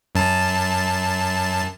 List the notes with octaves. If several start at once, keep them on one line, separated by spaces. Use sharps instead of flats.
F#2 A5